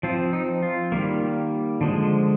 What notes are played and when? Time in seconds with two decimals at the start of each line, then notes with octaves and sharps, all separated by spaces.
0.03 F3 C4 F4
0.33 D#4
0.63 F4
0.92 D#3 G3 A#3
1.81 D3 F3 G#3